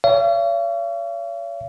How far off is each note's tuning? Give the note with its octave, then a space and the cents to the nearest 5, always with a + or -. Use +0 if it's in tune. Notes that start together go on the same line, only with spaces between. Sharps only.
C#5 +40 F5 -45